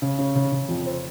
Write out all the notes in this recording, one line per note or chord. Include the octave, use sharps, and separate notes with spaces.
C#3
C#3
C#3
C#3
F2
C4